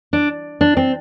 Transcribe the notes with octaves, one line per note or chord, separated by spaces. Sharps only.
D4
D4
C4